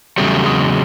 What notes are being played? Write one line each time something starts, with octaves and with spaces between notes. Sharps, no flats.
E2 C#3 F#3 G3 A3
G#3